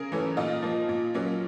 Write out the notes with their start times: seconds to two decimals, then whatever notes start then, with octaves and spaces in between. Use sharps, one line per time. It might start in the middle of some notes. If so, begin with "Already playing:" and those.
Already playing: C#3 G#4 A#4
0.12 E3 A3 C#4
0.37 A#2 D#4 F4
0.62 F3 A#3
0.89 A#2
1.14 F#3 A#3 C#4